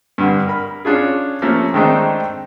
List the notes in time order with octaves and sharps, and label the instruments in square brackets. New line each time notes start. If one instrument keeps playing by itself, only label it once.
[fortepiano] G2 D3
A#4 B5
C#4 D4 F4 G#4
F3 A3 A#3 C#4
D#3 G#3 A3 C4 D4 D#4